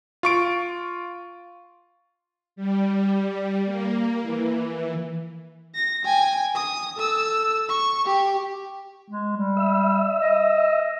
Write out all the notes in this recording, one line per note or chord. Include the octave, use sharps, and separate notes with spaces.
F4 C#6 D7
G3
A#3
E3
A#6
G5 G#5
D#6
A4 E6
C#6
G4
G#3
G3
E5
D#5